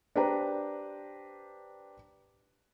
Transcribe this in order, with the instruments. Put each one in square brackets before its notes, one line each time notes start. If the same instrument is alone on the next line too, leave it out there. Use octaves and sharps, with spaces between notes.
[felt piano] D4 G4 B4 C5 G5 A#5